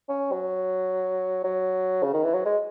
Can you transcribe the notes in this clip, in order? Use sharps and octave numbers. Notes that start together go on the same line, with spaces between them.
C#4
F#3
F#3
C#3
D#3
E3
F#3
G#3